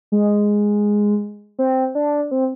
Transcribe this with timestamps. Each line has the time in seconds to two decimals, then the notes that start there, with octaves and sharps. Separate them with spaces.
0.12 G#3
1.59 C4
1.95 D4
2.31 C4